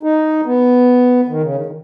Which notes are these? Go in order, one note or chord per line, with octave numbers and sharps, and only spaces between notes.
D#4
B3
D#3
C#3
D#3
D#3